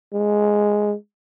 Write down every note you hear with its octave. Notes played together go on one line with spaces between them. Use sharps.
G#3